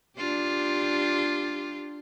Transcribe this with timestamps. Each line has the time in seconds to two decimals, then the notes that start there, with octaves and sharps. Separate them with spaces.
0.17 D4 F4 G4